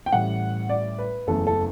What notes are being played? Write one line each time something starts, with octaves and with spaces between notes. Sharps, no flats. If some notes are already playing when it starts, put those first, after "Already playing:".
G5
A1 A2 G3 F#5
D5
B4
F#1 E2 C#3 E3 A3 A4
A4